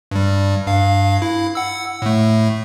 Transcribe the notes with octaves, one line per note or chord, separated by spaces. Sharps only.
G2 G3
G2 F5
E4
F#5 E6
A2 A3